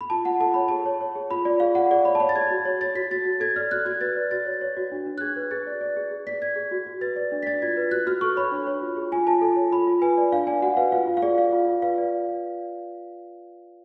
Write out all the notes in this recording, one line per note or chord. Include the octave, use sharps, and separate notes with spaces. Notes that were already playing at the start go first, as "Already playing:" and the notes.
B5
F4 A5
F4 F#5
A4 A5
C#5 B5
G#4 A5
C#5
C#5
G#4
F4 B5
F4 D5
G#4 F5
D5 F#5
G#4 D5
C#5 B5
A5
C#5 B5
A6
G#4 G#6
F#4
C#5
C#5 A6
F#4 B6
F#4 A6
F#4
A4 G#6
D5 F6
F#4 F#6
F#4 G#6
B4 A6
D5
F#4 A6
C#5
C#5
F#4
D4
D4
F#6
G#4 G#6
B4
G#4 A6
D5
D5
G#4
G#4
D5 B6
D5 G#6
G#4
F#4
F#4
B4 A6
D5
D4
B6
D5 A6
F4 G#6
B4
F#4 F#6
F#4 F6
A4 C#6
C#5 B5
D4
C#5
F4
G#4
F4 G#5
F4 A5
A4
C#5
F4 B5
F4
B4 G#5
D5
D4 F5
D5 G#5
F#4 F#5
B4 F5
F4 F5
F4
F5
G#4 D5
D5 F5
F4
F4
B4 F5
D5